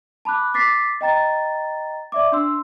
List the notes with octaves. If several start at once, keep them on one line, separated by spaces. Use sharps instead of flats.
A5 B5 D6 F#6
D6 A6 B6 C7
D#5 G5 A#5 A6
D5 E5 D6
D4 C6 E6